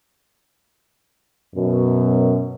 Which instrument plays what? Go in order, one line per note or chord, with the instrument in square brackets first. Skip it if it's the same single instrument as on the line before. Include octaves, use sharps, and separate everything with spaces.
[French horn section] F#2 B2